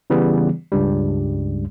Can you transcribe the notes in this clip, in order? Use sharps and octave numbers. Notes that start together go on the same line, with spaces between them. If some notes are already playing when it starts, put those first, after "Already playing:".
C#3 E3 G3 B3
C#2 G2 G3